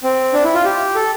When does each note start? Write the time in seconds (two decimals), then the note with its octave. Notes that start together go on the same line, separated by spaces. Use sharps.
0.03 C4
0.33 D4
0.44 E4
0.54 F4
0.64 G4
0.95 A4